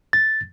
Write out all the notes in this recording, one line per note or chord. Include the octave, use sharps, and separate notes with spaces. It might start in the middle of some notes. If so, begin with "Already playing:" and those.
A6